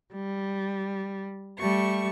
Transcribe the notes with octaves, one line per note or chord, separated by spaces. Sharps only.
G3
G3 A3 C#6